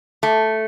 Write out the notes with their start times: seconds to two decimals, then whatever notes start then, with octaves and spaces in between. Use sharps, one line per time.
0.23 A3